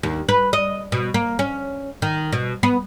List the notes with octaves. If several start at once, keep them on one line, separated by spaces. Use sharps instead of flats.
D#2
B4
D#5
B2
A#3
C#4
D#3
B2
B3